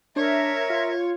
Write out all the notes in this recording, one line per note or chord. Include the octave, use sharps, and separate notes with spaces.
D4 A#4 C#5 E5
F4